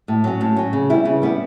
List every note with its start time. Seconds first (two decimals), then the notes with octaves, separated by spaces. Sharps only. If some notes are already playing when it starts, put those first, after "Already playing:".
0.08 A2
0.24 F#3 C#4
0.41 A2
0.56 F#3 C#4
0.73 C#3
0.90 G3 B3 E4
1.05 C#3
1.22 G3 B3 E4